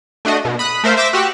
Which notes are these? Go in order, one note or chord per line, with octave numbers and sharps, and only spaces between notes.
A3 D4 F#4 D#5
B2
B5 D#6 F#6
A3 A#4 C5 E5 F5
C5 E5 D6 E6 A#6 B6
F#4 G4 E6 F#6